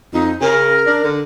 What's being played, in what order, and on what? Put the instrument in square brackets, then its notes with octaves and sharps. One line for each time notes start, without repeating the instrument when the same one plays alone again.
[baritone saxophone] F2 [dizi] D#4
[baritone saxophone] C#3 [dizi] A#4
[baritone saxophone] D4
D3